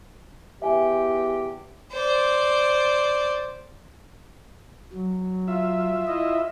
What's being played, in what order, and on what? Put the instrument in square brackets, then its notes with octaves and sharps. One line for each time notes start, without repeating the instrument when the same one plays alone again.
[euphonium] E2 [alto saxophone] G4 [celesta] E5 G#5
[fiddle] C5 D5
[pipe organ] F#3
[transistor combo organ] F4 E5
[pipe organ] E4 D#5